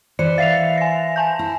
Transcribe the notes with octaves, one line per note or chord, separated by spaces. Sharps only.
E3 B4 C5 D5 C#7
E5 F5 A6 C7 F7
G#5 A#6
G#5 A5 G6
E4